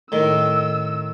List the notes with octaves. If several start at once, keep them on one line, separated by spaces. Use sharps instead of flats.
A2 D#3 E6